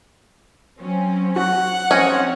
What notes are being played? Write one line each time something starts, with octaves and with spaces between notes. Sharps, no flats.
F#3 C4 C#4
F#4 F#5
F3 C4 C#4 C#5 D#5